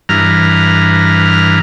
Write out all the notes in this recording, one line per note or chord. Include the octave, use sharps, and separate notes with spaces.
G2 E3 A#5 F6